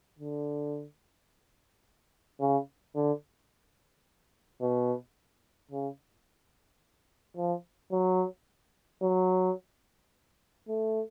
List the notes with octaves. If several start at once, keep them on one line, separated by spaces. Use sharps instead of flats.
D3
C#3
D3
B2
C#3
F3
F#3
F#3
A3